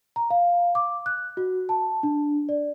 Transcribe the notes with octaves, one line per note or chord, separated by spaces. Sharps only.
A#5
F5
D6
F#6
F#4
A5
D4
D5